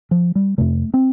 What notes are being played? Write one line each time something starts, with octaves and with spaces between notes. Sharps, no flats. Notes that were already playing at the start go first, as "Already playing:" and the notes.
F3
G3
F2 C3 A3
C4